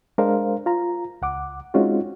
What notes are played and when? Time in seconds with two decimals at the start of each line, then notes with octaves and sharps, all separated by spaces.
0.18 G#3 D4 A#4 C5 F5
0.66 F4 A#5
1.22 C#2 F#5 D6
1.74 G#3 C4 C#4 D#4 F4 F#4